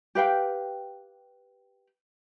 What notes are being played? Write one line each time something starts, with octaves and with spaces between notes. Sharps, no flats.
G4 B4 F5 G5